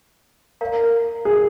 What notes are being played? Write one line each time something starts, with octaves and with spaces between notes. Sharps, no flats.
A#4 D5 F5 A#5
G#4